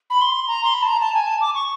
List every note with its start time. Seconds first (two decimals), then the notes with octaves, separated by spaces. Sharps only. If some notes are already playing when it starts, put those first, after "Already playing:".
0.10 B5
0.21 C6
0.48 A#5
0.64 C6
0.74 B5
0.82 A5
0.88 A#5
1.01 A5
1.14 G#5
1.27 A5
1.41 D6
1.55 C#6